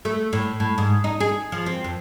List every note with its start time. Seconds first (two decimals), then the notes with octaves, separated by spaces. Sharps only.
0.05 A3
0.33 A2
0.60 A2
0.78 G#2
1.04 D#4
1.20 G#4
1.52 F3
1.66 C4
1.84 F2